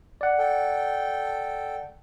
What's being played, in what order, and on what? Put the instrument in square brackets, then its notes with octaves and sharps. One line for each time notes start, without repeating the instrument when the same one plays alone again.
[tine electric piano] D5 F#5
[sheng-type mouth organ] A4 G5